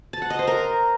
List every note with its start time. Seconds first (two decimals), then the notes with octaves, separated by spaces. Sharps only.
0.13 A5
0.22 F#5
0.30 D#5
0.39 C5
0.47 A#4